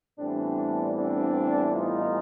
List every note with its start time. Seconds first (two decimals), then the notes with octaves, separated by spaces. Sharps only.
0.19 A2 E3 G3 B3 C4 D4
0.96 C4 D4
1.73 D#4 F4